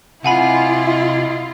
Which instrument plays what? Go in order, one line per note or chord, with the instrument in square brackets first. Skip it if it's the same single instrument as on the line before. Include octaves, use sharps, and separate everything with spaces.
[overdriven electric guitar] C3 [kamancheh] E4 D#5 [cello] F4 [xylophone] F#5 G#5 B5